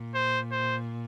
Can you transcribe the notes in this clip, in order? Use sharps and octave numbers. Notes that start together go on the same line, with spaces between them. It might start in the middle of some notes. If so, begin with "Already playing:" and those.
Already playing: A#2
C5
C5